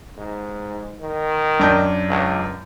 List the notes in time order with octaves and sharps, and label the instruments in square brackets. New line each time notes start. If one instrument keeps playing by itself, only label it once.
[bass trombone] G#2
D#3
[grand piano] F#2 D4 G6
[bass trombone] C#2